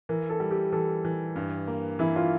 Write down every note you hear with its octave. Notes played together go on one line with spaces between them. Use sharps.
E3 A#4
A4
G3
G4
E3 A4
E3
G2
A#3
E3 E4
F4